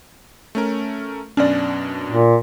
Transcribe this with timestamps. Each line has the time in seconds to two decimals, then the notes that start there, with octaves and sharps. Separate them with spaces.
0.55 A3 C#4 A#4
1.37 F#2 B2 C#4 D4 D5
2.10 A#2